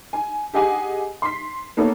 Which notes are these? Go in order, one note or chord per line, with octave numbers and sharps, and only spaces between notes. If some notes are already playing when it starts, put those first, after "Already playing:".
G#5
G4 G#4 D#5 F#5 G#5
C6 B6
A#3 B3 D#4 A4 C#5